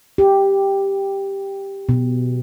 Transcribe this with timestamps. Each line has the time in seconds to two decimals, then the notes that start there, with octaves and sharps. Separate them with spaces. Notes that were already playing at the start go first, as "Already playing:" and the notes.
0.18 G4
1.89 B2